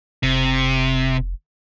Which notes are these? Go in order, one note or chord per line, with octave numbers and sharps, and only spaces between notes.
F1 C3